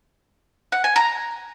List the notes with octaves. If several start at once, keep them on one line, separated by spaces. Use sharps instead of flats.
F#5
G#5
A#5